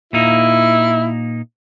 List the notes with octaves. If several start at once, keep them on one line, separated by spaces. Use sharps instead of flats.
A#2 A#3 D#4 E4